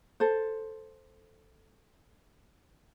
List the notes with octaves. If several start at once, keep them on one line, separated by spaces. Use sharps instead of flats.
A4 C5